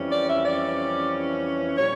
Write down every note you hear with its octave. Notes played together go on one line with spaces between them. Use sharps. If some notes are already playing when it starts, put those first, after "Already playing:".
Already playing: F2 E3 G3 C#4
D5
E5
D5
A#2 G3 C#5